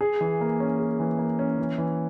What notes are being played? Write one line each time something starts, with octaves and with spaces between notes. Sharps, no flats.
G#4
E3
A#3
C#4
G#4
E3
A#3
C#4
E3
E3